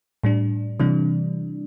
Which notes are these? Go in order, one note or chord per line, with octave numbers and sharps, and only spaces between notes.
A2 G3 D4
C3 E3 G3 D4